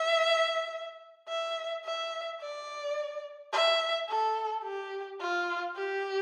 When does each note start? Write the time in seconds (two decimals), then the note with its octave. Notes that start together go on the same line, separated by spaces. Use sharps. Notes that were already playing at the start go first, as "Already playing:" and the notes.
Already playing: E5
1.29 E5
1.85 E5
2.41 D5
3.53 E5
4.09 A4
4.64 G4
5.20 F4
5.76 G4